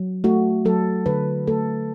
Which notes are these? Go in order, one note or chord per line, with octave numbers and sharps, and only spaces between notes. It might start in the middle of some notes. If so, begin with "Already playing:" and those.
Already playing: F#3
A3 F#4
F#3 A4
D3 B4
A3 A4